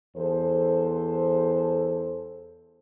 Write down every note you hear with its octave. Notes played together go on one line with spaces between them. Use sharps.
E2 A4 C5